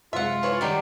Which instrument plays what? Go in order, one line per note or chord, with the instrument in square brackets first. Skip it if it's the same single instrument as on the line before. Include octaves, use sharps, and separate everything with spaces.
[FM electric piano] F#2 C3 G#3 [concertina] F4 [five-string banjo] E5 F#5
[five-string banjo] E3 E4 C#5
[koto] D#3 F#3 G3